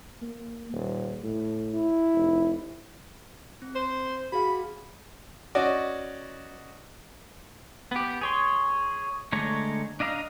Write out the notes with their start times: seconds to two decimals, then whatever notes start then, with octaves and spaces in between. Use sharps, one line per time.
0.22 A#3
0.73 D#1
1.23 A2
1.74 E4
2.14 F1
3.62 C4
3.75 C5
4.32 F#4 G#4 F5 B5
5.55 C#4 F#4 D5 D#5
7.91 B3 G4
8.21 G#4 C#5 C6
9.32 D3 G#3 A3 C#5 A#5
10.00 D4 D#5 F5 A#5